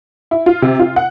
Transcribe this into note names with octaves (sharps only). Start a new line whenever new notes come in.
E4
F4
C3
F4
F#5